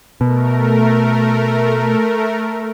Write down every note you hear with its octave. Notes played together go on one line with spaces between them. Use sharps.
B2 A3 A#4